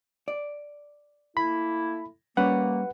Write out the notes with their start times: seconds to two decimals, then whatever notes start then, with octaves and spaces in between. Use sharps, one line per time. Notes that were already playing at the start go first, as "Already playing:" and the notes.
0.28 D5
1.37 A3 A#3 E4 B5
2.37 G3 A#3 C#4 B4 F#5